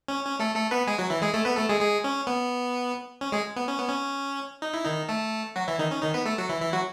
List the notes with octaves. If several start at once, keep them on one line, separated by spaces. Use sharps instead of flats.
C#4
C#4
A3 A4
A3 A4
B3 B4
G#3 G#4
F#3 F#4
E3 E4
G#3 G#4
A3 A4
B3 B4
A3 A4
G#3 G#4
G#3 G#4
C#4
B3
C#4
G#3 G#4
B3
C#4
B3
C#4
D#4
E4
D#3 D#4
A3 A4
F#3 F#4
E3 E4
D#3 D#4
C#4
D#3 D#4
B3 B4
A3 A4
F#3 F#4
E3 E4
E3 E4
F#3 F#4